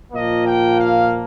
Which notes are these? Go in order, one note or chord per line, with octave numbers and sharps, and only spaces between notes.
A#2 F3 A#3 D#5
G5
F5